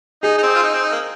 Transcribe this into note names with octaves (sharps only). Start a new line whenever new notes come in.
D#4 G#4
D#4
C4
F4
D#4
C4
D#4
A#3